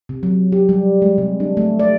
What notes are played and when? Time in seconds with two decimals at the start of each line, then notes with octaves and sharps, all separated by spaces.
0.09 C3
0.23 F#3
0.52 G4
0.69 G3
1.02 G#3
1.18 C3
1.40 D4
1.57 A3
1.79 D5